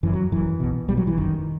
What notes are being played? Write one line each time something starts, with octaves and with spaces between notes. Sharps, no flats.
G1 F#2 E3
F#3
G1 F#2 E3
B1 B2
B1 B2 G3
F#3
E3
F#1 F#2 D#3